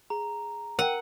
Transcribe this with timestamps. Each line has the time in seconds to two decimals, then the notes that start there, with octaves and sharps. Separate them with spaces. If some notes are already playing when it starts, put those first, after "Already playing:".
0.10 G#4 A#5
0.79 A#4 F#5 G5 D#7